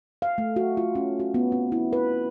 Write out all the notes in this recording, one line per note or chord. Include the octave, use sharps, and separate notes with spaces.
F5
A3
F#4
F4
C#4
F#4
B3
C4
E4
B4